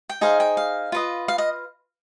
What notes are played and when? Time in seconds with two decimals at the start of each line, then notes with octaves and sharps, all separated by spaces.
0.09 G5
0.21 D#4 G#4 C5 D#5 F5
0.40 G5
0.57 F5
0.92 F4 B4 D#5
1.28 F5
1.38 D#5